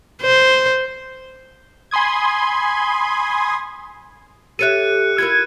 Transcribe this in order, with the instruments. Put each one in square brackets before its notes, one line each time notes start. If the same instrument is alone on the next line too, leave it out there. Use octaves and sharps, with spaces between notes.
[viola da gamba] C5
[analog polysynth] G#5 B5 C6 D#6 G#6
[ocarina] G4 [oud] A4 C#5 E5 [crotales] F#6 C#7 D#7
[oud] E4 F4 A#4 [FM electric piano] G#6 [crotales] C#7